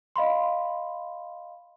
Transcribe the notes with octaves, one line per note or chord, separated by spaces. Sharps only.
D#5 F5 B5 C6